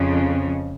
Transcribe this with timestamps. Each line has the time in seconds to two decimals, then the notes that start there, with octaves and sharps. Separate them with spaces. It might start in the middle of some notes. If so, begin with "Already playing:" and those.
Already playing: F2 C#3 F3